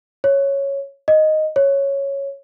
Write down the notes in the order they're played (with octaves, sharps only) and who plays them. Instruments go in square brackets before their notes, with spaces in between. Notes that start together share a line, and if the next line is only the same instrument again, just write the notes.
[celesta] C#5
D#5
C#5